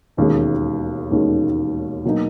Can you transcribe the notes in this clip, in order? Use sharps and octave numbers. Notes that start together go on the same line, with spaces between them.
E1 D#2 D#3 G#3 C#4
E1 D#2 D#3 G#3 C#4
B2 F#3 A#3 D#4